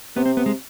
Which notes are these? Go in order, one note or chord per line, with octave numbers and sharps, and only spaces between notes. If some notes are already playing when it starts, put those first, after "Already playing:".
C3 B3
C4
B3
G#3